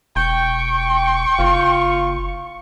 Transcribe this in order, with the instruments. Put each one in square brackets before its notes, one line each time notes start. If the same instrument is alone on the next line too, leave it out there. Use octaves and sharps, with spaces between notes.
[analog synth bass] E1 [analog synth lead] G5 [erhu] C#6
[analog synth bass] F#1 [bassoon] F4